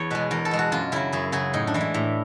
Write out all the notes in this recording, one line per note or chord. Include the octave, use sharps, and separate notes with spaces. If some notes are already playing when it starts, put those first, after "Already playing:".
Already playing: E2 C#5
B2 G#3 B4
E2 A#4
A4
B2 G#3
F#4
F#2 F4
C#3 F#3 E4
F#2 G#4
C#3 F#3 G#4
A2 D#4
D4
E3 G#3
E4
A2